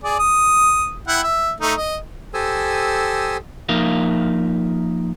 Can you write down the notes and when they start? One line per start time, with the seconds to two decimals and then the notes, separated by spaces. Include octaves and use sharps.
0.03 G#4 D5
0.19 D#6
1.08 E4 F#5 G5
1.23 E5
1.60 A3 D#4
1.76 D#5
2.34 G4 A4 C5 G#5 D#6 E6
3.69 F3 A#3 D#4 A#4 E5 F5